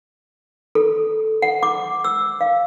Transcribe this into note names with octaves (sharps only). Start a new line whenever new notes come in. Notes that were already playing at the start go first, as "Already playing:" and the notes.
A4
F#5
D6
E6
F5